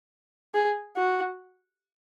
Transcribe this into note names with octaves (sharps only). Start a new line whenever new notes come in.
G#4
F#4